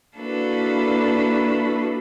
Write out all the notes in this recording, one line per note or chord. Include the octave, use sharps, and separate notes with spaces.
A#3 D4 E4 F#4 A4 B4